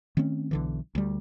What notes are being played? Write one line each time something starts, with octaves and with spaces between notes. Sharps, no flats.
D#3 A3 C4 C#4
B1 D3 E3
D2 G3